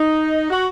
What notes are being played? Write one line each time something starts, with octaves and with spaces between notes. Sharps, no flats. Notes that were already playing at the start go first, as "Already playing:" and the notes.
Already playing: D#4
F#4